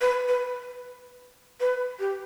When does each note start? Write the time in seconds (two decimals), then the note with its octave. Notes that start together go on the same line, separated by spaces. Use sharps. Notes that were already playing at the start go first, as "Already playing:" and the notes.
0.01 B4
0.28 B4
1.60 B4
2.00 G4